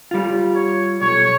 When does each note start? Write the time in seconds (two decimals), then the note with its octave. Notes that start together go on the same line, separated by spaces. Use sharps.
0.11 G3 F4
0.55 C#5
1.01 B1 C#5